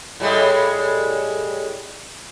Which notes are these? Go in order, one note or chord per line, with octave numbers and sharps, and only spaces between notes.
A2 G3 G#3